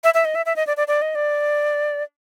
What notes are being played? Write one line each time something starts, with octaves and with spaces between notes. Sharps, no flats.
E5
E5
D#5
E5
E5
D#5
D5
D5
D5
D#5
D5